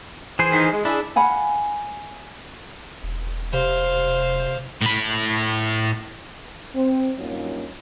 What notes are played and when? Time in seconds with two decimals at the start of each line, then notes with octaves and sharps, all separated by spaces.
0.39 E3 G#4 C5
0.52 D#3 G#3
0.72 G#3
0.85 D4 E4 G#4
1.16 F5 F#5 G#5 B5
3.03 E1
3.53 C3 C5 F5
4.82 A2 B5
6.75 C4
7.19 G2 F#3 A#3 C#4 D#4 F4